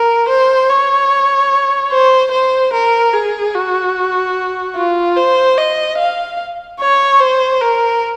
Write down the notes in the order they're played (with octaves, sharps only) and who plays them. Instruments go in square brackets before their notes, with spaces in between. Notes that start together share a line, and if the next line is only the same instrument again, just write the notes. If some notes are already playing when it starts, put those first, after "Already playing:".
Already playing: [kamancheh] A#4
C5
C#5
C5
C5
A#4
G#4
F#4
F4
C5
D#5
F5
C#5
C5
A#4